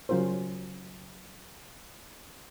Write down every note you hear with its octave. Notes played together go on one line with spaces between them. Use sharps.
C#3 F#3 C#4 F4 A#4 C5